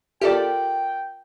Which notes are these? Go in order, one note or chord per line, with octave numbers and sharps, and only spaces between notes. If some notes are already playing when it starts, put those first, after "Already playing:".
F4 G4 A4 A#4 D5 G5